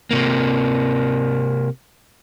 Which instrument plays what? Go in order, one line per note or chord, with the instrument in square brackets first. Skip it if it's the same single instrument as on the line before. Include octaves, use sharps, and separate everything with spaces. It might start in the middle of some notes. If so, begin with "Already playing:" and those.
[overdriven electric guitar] C3 A#3